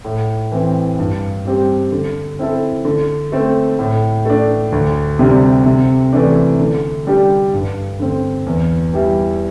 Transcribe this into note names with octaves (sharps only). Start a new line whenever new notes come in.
A2
E3 C4
G2
G3 C4 G4
D3
C4 E4 A4
D3
A3 C4
A2
A3 D4
D2
C3 G3 D4
C3
E3 A3 D4
D3
G3 D4 G4
G2
D3 C4
E2
E3 G3 E4